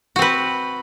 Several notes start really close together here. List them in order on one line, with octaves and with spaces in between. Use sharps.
F#4 C4 B4